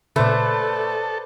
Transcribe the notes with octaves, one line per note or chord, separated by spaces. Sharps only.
A#2 C#3 A3 A4 B4 C5 D5